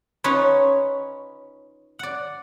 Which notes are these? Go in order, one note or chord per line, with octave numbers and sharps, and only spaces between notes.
C#4 D#4 F4 B4 C#5
D5 F#5